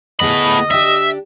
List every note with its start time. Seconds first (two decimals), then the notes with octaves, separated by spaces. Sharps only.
0.20 D2 A2 B3 G#4 D#5 B5
0.71 D4 G4 E5 E6